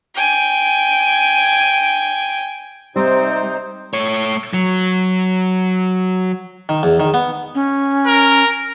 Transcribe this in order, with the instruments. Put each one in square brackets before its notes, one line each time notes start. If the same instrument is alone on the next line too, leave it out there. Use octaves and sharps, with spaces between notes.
[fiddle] G5 G#5
[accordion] C3 D#4 C5 [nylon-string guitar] G3 [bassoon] C4
[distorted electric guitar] A3 C#5
F#3
[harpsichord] D#3
E2
D#3
B3
[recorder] C#4
[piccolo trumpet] A#4